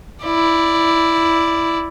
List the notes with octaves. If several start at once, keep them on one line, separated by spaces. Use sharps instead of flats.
E4 D5